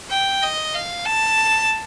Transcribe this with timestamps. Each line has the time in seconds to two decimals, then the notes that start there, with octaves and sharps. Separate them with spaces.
0.10 G5
0.43 D#5
0.74 F5
1.06 A5